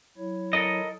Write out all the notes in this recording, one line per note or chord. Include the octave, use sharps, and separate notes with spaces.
F#3 E4 C#5
A4 A#4 D#5